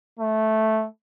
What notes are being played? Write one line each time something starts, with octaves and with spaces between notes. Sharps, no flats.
A3